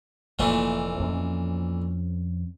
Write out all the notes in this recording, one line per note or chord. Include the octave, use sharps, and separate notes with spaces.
F1 A#2 E3 A3 A#3
F2 C4 C#4